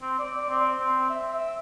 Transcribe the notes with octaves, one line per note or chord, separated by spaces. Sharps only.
C4
D5
C4
C4
E5
E5